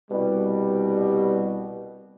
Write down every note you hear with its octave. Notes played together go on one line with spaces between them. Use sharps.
C2 B2 G3